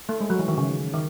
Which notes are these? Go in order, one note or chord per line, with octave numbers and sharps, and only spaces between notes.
A3
G#3
F#3
E3
D#3
C#3
D#3